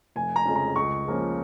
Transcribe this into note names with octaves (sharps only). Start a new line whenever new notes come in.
F1 G#5
A#5
F2 C#3 G#3 C#4
A#5
C#2 C#6
C#3 F3 A#3 C#4